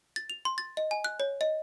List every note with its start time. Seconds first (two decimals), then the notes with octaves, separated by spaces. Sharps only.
0.16 A6
0.30 F7
0.45 C6
0.58 A6
0.77 D#5
0.91 G#5
1.04 F#6
1.20 C#5
1.41 D#5